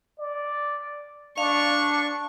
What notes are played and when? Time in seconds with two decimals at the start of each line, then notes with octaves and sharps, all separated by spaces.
0.19 D5
1.38 D4 F5 C#6